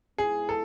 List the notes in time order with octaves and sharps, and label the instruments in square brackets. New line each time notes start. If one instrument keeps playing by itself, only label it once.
[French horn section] G#2 G#3 B3 E4 [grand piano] G#4
[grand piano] A4